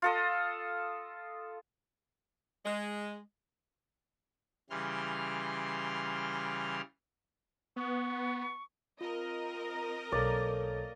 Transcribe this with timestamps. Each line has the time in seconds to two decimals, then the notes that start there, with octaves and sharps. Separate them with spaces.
0.02 F4 A4 D#5
2.65 G#3
4.70 C#3 E3 G3 C6 F6
7.76 B3 C#6
9.01 C4 F4 A#4 D#5
10.12 B1 A#3 A4 C#5 D5